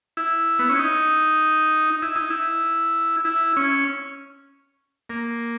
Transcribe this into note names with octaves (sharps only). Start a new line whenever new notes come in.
E4
B3
C#4
D#4
E4
D#4
E4
E4
C#4
A#3